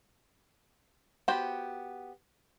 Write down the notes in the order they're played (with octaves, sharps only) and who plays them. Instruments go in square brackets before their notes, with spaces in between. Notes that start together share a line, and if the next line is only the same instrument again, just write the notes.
[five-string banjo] B3 F#4 G4 C5 G5